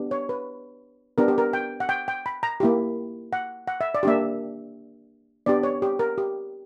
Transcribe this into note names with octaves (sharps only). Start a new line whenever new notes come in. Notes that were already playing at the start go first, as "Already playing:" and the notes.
Already playing: B3 D4 G4
C#5
B4
B3 D4 G4 A#4
G4
A#4
G5
F#5
G5
G5
B5
A#5
A#3 E4 G4
F#5
F#5
E5
D5
A#3 D4 G4 E5
B3 D4 G4 D5
C#5
G4
A#4
G4